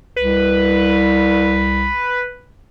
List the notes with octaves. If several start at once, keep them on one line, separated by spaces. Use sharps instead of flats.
C2 B4